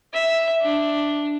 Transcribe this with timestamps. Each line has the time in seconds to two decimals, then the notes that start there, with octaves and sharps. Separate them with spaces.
0.13 E5
0.61 D4